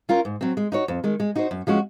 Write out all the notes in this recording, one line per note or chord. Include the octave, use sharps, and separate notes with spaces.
C#4 F4 A#4
G#2
F#3 C4
G#3
D#4 F#4 C#5
F2
D#3 G#3
G#3
D#4 F#4 C5
F#2
F3 G#3 C#4 F#4